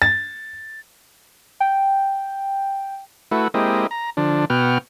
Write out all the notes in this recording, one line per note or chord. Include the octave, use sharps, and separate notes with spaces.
A6
G5
A3 E4 F#4 B4
G#3 A#3 C4 E4 G4 D#5
A#5
D3 F3 D4
B2 B3 F#4 G5 F6